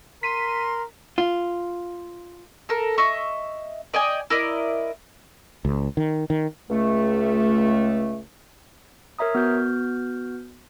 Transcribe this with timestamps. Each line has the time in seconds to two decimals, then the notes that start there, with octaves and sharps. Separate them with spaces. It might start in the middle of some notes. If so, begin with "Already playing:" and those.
0.23 A#4 C6 B6 D#7
1.18 F4
2.69 A4 A#4
2.98 D#5 E5 C#6
3.94 D5 D#5 G5 G#5
4.30 E4 A#4 D5 D#5
5.65 C#2
5.97 D#3
6.30 D#3
6.70 C#2 A3
9.19 A#4 C#5 E5 A#5 D#6
9.35 B3 F#4 F6 G6